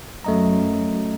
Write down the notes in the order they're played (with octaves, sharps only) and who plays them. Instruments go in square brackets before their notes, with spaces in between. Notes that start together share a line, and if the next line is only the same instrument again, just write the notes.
[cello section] F#2 [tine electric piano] A3 D#5 A#5